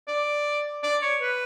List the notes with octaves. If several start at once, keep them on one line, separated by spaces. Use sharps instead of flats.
D5
D5
C#5
B4